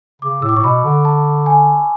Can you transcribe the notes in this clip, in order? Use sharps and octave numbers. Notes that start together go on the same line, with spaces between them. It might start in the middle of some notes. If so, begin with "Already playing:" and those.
C#3 D6
A2 E6
D6
A2 C#6
B2 B5
D3
A5
G#5